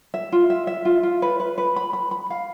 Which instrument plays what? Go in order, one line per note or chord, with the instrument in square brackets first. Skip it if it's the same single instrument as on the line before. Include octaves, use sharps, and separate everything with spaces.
[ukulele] E5
F4
E5
E5
F4
F4
B4
B4
B4
B5
B5
B5
F5